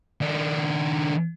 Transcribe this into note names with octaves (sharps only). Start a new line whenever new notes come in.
D#3 D4